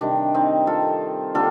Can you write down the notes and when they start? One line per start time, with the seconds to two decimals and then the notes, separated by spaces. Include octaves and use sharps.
0.01 C3 D#3 G3 D4
0.34 C4 D#4
0.67 F4 A4
1.34 D3 G3 A#3 F4 A4